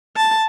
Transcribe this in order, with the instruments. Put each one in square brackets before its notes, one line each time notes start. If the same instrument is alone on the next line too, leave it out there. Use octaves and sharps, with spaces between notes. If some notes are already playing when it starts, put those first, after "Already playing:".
[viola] A5